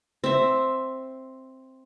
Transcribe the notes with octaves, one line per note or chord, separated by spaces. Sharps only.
C4 E5